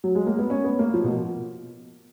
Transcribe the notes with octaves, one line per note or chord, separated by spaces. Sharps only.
F#3
G#3
A#3
B3
C#4
B3
A#3
F3
B2